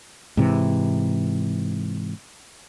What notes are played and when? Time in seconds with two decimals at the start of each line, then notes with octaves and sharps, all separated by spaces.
0.37 G#2 C3 E3